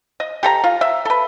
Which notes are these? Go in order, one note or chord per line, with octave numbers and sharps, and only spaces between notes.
D#5
G4 A4 A#5
F4
E5
A4 B4